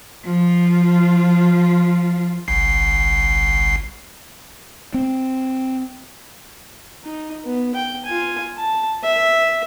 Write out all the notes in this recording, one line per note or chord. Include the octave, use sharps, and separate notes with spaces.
F3 F4
G1 C2 C7
C4
D#4
B3
G5
F4 G#5
A5
E5